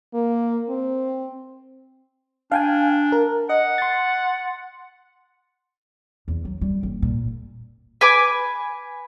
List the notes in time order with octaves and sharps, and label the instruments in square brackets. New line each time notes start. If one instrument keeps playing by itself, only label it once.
[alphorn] A#3
C4
[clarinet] D4 [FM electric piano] F5 G5 G#5
[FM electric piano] A#4
[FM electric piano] D#5 [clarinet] F#5
[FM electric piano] C6 A6
[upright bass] E2
F#3
G3
F#1
A#2
[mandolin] B4 G#5 D6